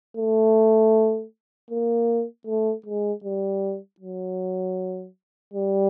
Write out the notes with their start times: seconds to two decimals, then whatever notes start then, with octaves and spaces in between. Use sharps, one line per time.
0.17 A3
1.70 A#3
2.47 A3
2.86 G#3
3.24 G3
4.00 F#3
5.53 G3